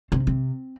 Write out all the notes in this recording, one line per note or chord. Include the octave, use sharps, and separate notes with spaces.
C3 C4
C4